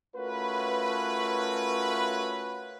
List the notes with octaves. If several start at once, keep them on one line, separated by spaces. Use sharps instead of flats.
A3 C#4 F4 F#4 A#4 B4